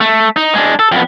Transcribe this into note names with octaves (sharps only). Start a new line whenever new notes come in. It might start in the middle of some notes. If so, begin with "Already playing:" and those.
A3
D#4
G#3 D4
A4
F2 B3